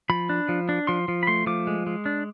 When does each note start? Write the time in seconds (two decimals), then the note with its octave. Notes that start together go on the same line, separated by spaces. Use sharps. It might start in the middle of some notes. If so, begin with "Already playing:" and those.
0.10 F3 B5
0.29 D4
0.49 F3
0.69 D4
0.87 F3 C6
1.08 F3
1.23 B5
1.27 A3 C6
1.46 F3 D6
1.67 G#3
1.87 G#3
2.06 D4